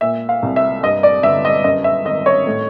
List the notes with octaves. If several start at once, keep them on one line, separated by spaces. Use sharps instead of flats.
A#2 E5
F5
C2
E5
G2 D#5
D5
G1 E5
D#5
F#2 D#5
E5
G#1 D#5
C#5
A2